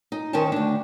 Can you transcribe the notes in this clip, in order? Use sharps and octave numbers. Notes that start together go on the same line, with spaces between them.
D#4
D#3 C#4 A#4 C5 G5 A5
D2 D4